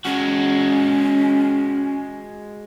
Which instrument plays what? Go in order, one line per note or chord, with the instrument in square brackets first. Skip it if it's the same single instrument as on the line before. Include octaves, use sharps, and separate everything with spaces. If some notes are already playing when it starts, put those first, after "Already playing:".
[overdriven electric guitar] G#3 F#4 [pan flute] C#4